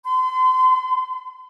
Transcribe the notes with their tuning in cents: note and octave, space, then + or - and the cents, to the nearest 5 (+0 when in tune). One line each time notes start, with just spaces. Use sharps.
C6 -40